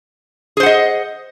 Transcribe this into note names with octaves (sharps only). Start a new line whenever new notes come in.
G#4 C5 D#5 F#5